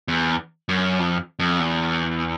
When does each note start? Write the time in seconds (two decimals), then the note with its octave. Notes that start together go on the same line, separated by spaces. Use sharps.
0.08 E2
0.69 F#2
0.99 F2
1.39 F2
1.60 E2